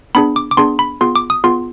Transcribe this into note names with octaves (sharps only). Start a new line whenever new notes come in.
B3 D4 G#4 B5
D6
D6
B3 D4 G#4 C6
B5
B3 F4 G#4 C6
D6
D#6
B3 F4 G#4 C6